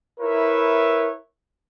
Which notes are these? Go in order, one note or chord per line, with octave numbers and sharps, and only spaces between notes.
E4 A#4 B4 C#5 E5